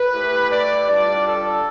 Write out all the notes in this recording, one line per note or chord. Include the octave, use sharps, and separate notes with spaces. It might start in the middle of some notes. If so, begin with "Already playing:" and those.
Already playing: B4
A3 E4 G4
D5
G3 D4 F4 D5
A4